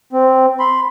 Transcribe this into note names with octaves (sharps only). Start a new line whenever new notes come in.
C4
B5 C6